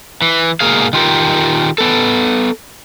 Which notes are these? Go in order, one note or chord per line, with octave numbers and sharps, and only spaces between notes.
E3
G#2 B2 A#3 G#4 F5
D#3 F4 G4 A#4
B3 A4